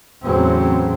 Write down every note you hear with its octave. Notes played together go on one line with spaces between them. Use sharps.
E2 A2 C#3 F#3 C4